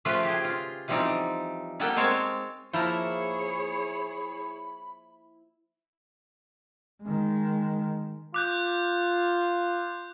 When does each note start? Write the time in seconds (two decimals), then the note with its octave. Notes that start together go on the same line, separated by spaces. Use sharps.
0.05 C#3 F3 A3 F4 G4 B4
0.25 G4 G#4
0.44 F4
0.88 E3 F3 G3 C4 D#4 D5
1.80 G3 A#3 B3 A4 G5
1.96 G#3 C4 C#5 F5 A5
2.73 F3 A#3 E4 G#4 C#5 A#5 B5
7.03 D#3 G#3
8.34 F4 D6 F#6 G6